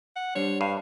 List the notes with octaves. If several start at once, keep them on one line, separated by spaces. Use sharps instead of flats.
F#5
G3 D4 C5 C#5
G2 F5